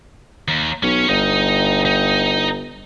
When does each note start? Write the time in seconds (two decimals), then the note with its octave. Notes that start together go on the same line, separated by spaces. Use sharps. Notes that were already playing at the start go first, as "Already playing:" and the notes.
0.48 D#2
0.83 B1 C#4 C#5
1.09 G1 D#4
1.85 D#4